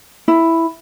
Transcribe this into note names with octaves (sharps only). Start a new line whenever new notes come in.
E4